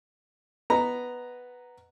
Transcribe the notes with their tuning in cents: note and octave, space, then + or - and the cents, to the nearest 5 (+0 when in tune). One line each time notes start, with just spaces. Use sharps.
B3 +0 D#5 -15 A#5 +0